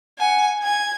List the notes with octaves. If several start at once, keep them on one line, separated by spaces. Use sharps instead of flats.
F#5 G#5
G#5 G#6